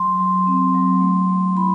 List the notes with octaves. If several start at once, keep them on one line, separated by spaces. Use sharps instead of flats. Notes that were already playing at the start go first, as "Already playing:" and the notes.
Already playing: F#3 C6
F#3
C4
F#3
A3
A3
E4 B5